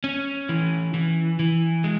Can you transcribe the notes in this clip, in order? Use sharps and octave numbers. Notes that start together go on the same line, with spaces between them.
C#4
E3
E3
E3
G#3